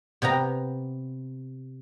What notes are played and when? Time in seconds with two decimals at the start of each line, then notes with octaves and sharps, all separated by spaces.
0.22 C3 B3 G5 A#5